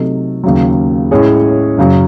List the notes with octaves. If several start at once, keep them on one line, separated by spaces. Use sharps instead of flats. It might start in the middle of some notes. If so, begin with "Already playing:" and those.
Already playing: C3 F#3 A3 D#4 A4
D#2 C#3 F#3
A2 G#3 C#4 G#4 C#5
F#2 C#3 F#3